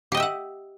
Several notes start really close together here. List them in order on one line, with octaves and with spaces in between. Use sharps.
G4 D#5 G5 E5 F#5